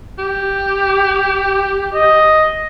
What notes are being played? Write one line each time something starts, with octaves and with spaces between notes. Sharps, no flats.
G4
D#5